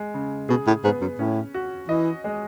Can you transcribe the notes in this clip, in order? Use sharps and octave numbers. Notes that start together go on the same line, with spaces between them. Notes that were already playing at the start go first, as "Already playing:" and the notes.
Already playing: G#3
C#3
B2 G#4
A2
G#2 B3
F#2
A2 C#4
F#4
E3 D#5
G#3